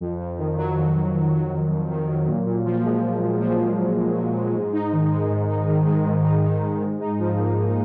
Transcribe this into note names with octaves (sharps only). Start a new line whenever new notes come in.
F2
F2
D#3
F#3
F2
F2
D#3
F#3
F2
F2
D#3
F#3
A#2
A#2
F3
G#3
A#2
A#2
F3
G#3
A#2
A#2
F3
G#3
G#2
D#4
D#3
G#3
G#2
D#4
D#3
G#3
G#2
D#4
D#3
G#3
G#2
D#4
F3
A#3
G#2